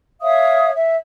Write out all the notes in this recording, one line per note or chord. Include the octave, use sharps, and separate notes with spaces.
C#5 E5 F5 D#6
E5